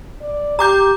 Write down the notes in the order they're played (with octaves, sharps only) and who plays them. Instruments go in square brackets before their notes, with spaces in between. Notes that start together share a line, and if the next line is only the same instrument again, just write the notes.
[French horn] D5
[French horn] G4 [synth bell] A#5 D6 G6